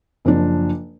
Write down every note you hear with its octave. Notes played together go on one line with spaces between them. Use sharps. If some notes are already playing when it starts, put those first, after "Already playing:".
F#1 F3 D4